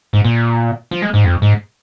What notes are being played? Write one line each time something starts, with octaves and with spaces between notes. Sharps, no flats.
G#2
A#2
F3
G#3
G#2
F2
G#2